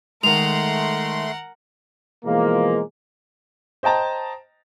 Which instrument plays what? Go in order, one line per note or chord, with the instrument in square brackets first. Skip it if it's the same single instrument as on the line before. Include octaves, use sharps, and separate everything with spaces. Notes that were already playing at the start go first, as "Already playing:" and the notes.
[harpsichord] D#3 G#3 [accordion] A3 C6 [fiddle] A#4 F#5 [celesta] F7
[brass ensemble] B2 E3 F3 G#3 A#3
[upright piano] C5 D#5 G5 A5 A#5